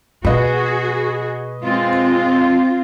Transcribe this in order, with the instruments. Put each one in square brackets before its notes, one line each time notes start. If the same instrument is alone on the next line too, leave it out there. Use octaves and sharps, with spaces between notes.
[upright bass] B2 [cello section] F#4 G#4 [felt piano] B4 D#5
[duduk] G#3 [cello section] C4 F4